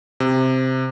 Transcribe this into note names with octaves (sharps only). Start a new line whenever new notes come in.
C3